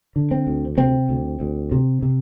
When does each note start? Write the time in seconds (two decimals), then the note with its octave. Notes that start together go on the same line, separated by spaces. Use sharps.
0.16 D3
0.31 C4
0.47 D2
0.78 C3 C4
1.09 D2
1.40 D2
1.72 C3
2.02 C3